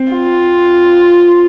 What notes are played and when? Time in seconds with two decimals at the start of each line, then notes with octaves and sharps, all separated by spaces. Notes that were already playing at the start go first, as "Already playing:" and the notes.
Already playing: C4
0.12 F4